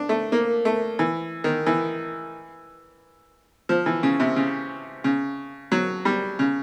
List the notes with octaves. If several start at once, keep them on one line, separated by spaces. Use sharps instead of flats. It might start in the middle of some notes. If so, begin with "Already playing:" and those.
Already playing: D4
A3
A#3
A3
E3
D#3
E3
F3
E3
C#3
C3
C#3
C#3
F#3
G3
C#3